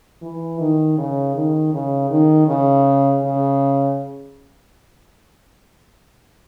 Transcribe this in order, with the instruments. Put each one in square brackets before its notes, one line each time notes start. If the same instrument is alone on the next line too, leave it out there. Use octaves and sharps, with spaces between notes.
[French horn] E3
D#3
C#3
D#3
C#3
D#3
C#3
C#3